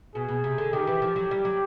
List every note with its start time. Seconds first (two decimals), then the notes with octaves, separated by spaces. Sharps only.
0.15 B2 G#4
0.29 B2
0.44 C3
0.58 D3
0.73 D#3 G4
0.87 E3
1.02 F3
1.16 F#3
1.31 G3
1.45 F#3